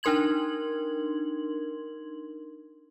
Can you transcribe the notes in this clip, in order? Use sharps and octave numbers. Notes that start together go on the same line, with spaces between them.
D4 D#4 A#4 C6 G#6 F#7